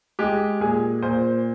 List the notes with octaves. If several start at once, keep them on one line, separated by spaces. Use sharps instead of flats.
G#3 G4
A#2 G#4
A#2 C5